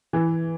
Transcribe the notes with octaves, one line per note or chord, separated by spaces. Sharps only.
E3